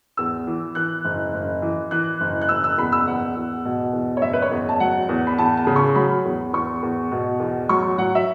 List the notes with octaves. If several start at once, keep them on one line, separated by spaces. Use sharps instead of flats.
E2 E6
E3
E3 F#6
F#1
F#1
E3
E3 F#6
F#1
F#6
F#1 E6
E6
E2 B5
E6
E2 F#5
E2
B2
E2
C#5
F#1 E5
B4
C#5
E2
A5
F#3 F#5
E2
B5
E2 A5
A5
C#3
C#6
F#3 B5
E2
E2 C#6
E2
B2
E2
F#3 C#6
F#3 F#5
E5